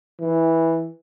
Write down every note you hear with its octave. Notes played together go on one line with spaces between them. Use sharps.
E3